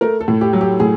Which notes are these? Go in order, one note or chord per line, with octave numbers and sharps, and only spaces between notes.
A3 A#4
A4
A2
G4
F#3
G4
A2 G#4